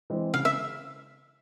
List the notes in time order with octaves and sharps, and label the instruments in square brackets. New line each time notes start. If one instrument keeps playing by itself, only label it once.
[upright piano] E3 G#3 C4
[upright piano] C#3 [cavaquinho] F5
[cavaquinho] E5